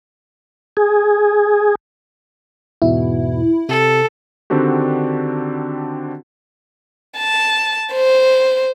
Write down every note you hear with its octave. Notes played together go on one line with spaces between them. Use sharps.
G#4
E2 G#2 B2 E4
C3 A4
D3 D#3 C4 D4 F#4 G4
A5
C5